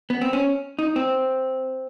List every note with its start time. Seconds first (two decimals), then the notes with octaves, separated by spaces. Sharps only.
0.10 B3
0.21 C4
0.33 C#4
0.79 D#4
0.96 C4